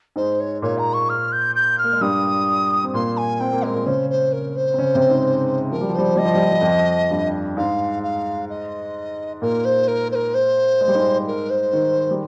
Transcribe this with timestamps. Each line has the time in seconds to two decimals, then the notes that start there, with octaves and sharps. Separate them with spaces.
0.16 G#2 G#3 C5
0.40 C#5
0.62 A#2 A#3 C#5
0.78 A#5
0.93 C#6
1.09 F6
1.32 G6
1.55 G6
1.78 F6
1.84 A#3
1.92 G#3
2.01 G2 G3 D#6
2.84 C4
2.94 A#2 A#3 C6
3.17 G#5
3.40 C4 G5
3.52 A#3
3.63 G#3 A#4
3.74 A#2 A#3
3.86 C#3 C#4 C5
4.10 C5
4.33 A#4
4.56 C5
4.74 C4
4.78 C#3 C#4
4.94 C3 C4
5.09 G#2 G#3
5.71 F3 A#4
5.81 G3
5.89 F3
5.95 G3 C5
6.08 F3
6.16 G3 D#5
6.25 F3
6.35 G3
6.44 F3
6.52 G3
6.61 F2 F3
7.10 G2 G3
7.57 G#2 G#3 F5
8.03 F5
8.49 D#5
9.41 A#2 A#3 A#4
9.65 C5
9.88 A#4
10.12 C5
10.15 A#4
10.34 C5
10.81 G#3
10.88 G3
10.95 G#2 G#3
11.27 A#4
11.50 C5
11.73 D#3
12.11 G3